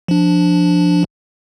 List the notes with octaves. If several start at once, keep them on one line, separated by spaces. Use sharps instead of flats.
F3 D4